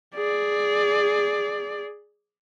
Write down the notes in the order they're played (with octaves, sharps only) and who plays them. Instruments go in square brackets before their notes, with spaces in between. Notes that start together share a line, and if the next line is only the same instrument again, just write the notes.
[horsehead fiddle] G#4 D5